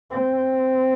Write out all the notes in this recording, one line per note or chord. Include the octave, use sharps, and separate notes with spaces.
C4